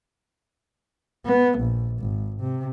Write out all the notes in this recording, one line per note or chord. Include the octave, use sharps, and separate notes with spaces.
B3
A#1
G#1
C3